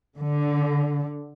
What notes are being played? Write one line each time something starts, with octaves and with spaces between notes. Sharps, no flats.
D3